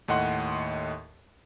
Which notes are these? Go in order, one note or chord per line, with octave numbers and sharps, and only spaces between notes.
D#2 A2 D#5 F#5 C6